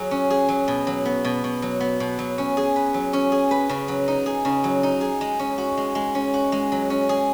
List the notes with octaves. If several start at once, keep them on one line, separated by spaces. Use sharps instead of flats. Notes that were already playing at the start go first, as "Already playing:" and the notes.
Already playing: F#3 G#4
C#4
G#4
F#3
B2
F#3
B3
B2
B2
F#3
B3
B2
F#3
C#4
G#4
B4
F#3
C#4
G#4
B4
C#3
F#3
D#4
G#4
C#3
F#3
D#4
G#4
G#3
C#4
F#4
G#3
G#3
C#4
F#4
G#3
F#3
C#4
G#4